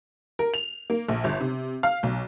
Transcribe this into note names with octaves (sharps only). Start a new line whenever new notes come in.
A#4
F7
A#3
A#1
G1
C3
F5
B1